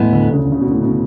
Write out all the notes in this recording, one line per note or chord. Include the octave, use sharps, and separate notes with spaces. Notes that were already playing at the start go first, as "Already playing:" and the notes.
Already playing: E2 A2 E3 G#3 B3
D2 D3
C#2 C#3
C#3
B2
A2
B2